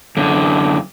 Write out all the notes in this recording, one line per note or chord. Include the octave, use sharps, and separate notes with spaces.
F#2 D3